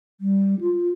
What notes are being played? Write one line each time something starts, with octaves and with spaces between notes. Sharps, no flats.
G3
F4